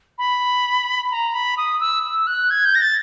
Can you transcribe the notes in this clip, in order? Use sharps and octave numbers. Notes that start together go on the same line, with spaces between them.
B5
A#5
B5
D#6
E6
E6
F#6
G#6
G6
A#6
A6